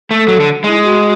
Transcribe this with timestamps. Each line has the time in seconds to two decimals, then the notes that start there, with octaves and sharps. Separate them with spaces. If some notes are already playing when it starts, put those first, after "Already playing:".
0.10 A3 A4
0.28 F#3
0.40 D3
0.64 G#3 E4
0.82 F#4